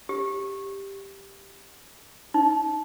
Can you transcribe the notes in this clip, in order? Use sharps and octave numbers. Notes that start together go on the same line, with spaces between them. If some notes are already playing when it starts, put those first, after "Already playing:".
G4
D#4